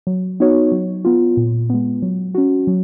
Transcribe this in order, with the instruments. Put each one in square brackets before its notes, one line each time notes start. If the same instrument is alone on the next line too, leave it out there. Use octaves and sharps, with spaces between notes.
[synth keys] F#3
B3 D#4 F#4 C#5
F#3
B3 F4
A#2
G#3 B3
F#3
C#4 F#4
F#3